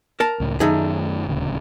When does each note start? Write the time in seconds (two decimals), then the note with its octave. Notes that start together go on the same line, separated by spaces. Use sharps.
0.20 A#4 A5
0.40 C#2 A2
0.60 F#2 D#3 A3 D#4 G#4
1.27 D#1 D2 C#3